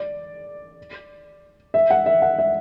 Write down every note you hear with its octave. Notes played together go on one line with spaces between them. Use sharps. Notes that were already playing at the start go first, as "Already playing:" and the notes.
Already playing: D5
E5
F#5
E5
F#5
E5